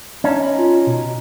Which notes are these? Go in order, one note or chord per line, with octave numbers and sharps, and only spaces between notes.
C#4 D#4 A5
B5
F4
B2